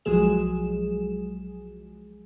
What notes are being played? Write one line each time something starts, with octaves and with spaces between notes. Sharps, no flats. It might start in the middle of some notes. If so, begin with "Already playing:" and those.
B1 F3 F#3 G#3 G#4 E7